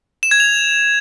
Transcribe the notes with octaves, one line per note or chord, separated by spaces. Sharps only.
E7
G#6
F7